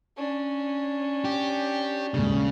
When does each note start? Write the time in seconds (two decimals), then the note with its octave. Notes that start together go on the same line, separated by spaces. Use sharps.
0.17 C#4 D4
1.25 G4
2.14 D#1 C#3 G#3